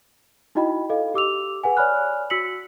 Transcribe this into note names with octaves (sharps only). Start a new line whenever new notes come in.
D#4 E4 F#4 D#5 G5 B5
A4 D#5 F5
G4 D6 E6 F7
G#4 B4 F#5 G#5
C#5 D5 G#5 B5 F6 F#6
F#4 E6 B6 C#7 F#7